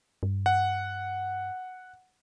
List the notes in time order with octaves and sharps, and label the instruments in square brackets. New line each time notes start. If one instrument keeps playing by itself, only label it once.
[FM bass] G2
[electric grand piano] F#5